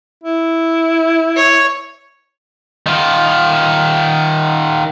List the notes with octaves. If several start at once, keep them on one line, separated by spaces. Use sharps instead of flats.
E4
C#5
D#3 F4